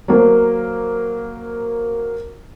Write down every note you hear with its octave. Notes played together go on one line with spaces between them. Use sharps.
F#3 A#3 C5